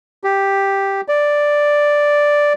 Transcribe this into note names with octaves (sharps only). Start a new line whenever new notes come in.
G4
D5